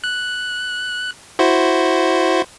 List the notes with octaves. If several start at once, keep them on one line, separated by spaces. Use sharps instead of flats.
F#6
E4 F#4 C5